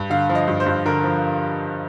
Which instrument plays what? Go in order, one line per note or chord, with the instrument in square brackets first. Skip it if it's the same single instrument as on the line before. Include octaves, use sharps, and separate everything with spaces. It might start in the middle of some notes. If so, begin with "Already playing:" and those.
Already playing: [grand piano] G2
D3 F5
F3
D#5
G2
C5
G2
D3 A#4
F3